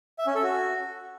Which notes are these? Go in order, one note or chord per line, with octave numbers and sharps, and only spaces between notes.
E5
C#4
A4
F#4